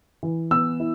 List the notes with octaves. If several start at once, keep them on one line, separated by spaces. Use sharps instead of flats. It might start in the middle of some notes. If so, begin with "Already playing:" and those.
E3
B3 E6
E4